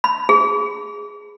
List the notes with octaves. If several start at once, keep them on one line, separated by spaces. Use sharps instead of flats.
B5
G#4